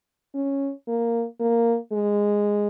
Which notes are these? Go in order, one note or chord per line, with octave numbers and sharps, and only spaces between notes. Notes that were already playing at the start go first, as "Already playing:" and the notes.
C#4
A#3
A#3
G#3